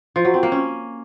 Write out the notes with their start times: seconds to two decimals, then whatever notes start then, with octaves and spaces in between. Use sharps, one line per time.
0.16 F3
0.25 F#3
0.34 C4
0.43 A#3
0.52 C#4